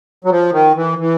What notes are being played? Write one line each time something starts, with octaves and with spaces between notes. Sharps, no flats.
F#3
F3
D#3
E3
E3